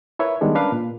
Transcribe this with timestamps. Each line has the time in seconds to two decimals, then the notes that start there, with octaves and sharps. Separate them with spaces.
0.19 E4 A#4 B4 C#5 E5
0.41 D#3 G3 G#3 B3 D4
0.55 C#4 D4 A#4 B4 F5
0.72 A#2